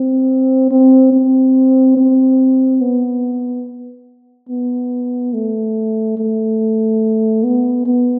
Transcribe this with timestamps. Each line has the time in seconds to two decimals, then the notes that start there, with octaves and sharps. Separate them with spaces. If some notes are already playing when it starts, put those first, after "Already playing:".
Already playing: C4
0.71 C4
1.13 C4
1.97 C4
2.81 B3
4.49 B3
5.34 A3
6.18 A3
7.44 B3
7.86 B3